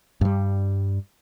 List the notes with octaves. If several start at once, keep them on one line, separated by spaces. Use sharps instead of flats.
G2 G3